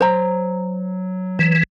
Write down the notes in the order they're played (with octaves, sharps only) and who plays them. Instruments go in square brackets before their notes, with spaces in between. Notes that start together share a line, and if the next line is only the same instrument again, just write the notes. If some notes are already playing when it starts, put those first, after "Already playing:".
[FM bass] F#3 [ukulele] C5 A#5
[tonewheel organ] E3